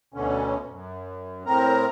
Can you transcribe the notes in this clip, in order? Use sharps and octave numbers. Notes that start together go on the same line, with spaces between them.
D2 B2 D3 C#4
F#2
A2 C4 A#4 A#5